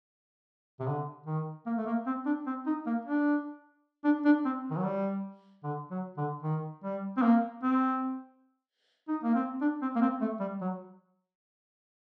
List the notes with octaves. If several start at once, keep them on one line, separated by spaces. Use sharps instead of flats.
C3
D3
D#3
A#3
A3
A#3
C4
D4
C4
D#4
A#3
D4
D4
D4
C4
D#3
F#3
G3
D3
F#3
D3
D#3
G3
C4
A#3
C4
D#4
A#3
C4
D4
C4
A#3
C4
A3
G3
F#3